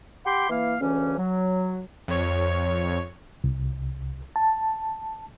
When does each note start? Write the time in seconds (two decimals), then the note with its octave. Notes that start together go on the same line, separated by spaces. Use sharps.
0.25 G4 F#5 G5 B5 C6 D6
0.50 E3 A#3 F5
0.80 D2 C#3 E3 C#4
1.17 F#3
2.08 F2 C#5
3.44 C2
4.36 A5